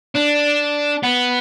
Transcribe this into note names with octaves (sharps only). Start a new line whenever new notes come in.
D4
B3